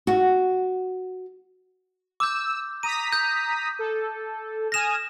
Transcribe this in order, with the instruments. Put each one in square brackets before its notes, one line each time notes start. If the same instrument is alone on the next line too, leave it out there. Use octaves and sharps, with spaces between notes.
[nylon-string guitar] F#4
[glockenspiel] D6 G6 [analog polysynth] E6
[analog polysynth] A#5 D#6 B6 [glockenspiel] D#7
[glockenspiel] G6
[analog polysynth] A4
[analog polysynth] G#5 D#6 F6 [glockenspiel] A#6 E7